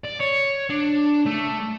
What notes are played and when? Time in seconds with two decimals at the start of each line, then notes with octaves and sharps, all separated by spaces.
0.05 D5
0.21 C#5
0.70 D4
1.26 A3